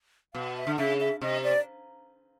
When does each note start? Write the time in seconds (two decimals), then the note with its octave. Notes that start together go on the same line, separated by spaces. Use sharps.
0.34 B2 F5
0.56 E5
0.67 D3
0.78 C#3 E5
1.00 E5
1.21 C3 D#5
1.44 D5